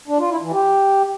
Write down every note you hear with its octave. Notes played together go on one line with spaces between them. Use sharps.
D4
F4
E4
E3
G4